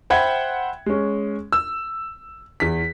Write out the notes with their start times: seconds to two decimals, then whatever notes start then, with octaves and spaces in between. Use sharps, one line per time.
0.10 C5 E5 F#5 G5 B5 G#6
0.86 G#3 C#4
1.52 E6
2.60 E2 B6